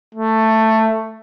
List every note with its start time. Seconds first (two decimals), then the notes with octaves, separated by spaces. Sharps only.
0.15 A3